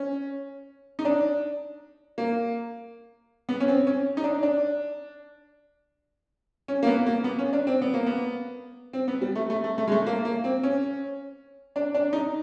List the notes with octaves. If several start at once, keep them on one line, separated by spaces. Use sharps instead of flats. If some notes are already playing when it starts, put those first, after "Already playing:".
Already playing: C#4
D#4
D4
A#3
B3
C#4
C4
C#4
D#4
D4
D4
C#4
A#3
B3
A#3
B3
C#4
D4
C4
B3
A#3
B3
C4
B3
G3
A3
A3
A3
A3
G#3
A3
A#3
A#3
C4
C#4
D4
D4
D#4